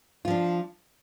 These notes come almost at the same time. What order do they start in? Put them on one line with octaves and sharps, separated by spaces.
F4 F3 D4